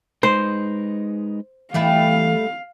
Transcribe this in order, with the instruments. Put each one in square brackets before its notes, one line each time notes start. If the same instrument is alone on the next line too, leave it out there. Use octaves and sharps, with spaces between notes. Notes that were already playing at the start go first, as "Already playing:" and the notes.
[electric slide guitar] G#3 D#4 B4 [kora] C5
[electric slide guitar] E3 [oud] G3 A3 E4 [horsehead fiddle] F5